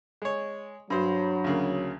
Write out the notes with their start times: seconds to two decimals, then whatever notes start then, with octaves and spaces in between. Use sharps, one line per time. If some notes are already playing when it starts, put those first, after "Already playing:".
0.22 G#3 C#5
0.90 G2 F#3 D4 C5 B5
1.44 D2 C#3 A#3